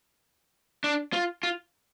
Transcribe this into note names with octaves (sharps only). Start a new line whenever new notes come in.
D4
F4
F4